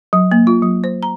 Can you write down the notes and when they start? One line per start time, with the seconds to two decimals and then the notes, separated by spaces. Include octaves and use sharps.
0.13 F#3
0.32 A#3
0.47 F4
0.62 F#3
0.84 C5
1.03 A#5